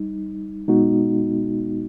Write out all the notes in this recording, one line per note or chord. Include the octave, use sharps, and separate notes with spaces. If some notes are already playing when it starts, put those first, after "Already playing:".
Already playing: G3 D#4
B2 G#3 B3 D#4 F#4